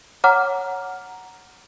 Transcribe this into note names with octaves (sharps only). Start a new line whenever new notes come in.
C#5 F#5 A#5 D6 F6